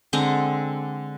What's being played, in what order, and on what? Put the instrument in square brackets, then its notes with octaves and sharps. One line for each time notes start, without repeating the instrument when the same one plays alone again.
[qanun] D3 G#3 C4 A#5